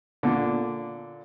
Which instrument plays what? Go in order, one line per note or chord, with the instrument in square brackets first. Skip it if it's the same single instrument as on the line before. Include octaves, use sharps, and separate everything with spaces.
[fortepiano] A#2 D3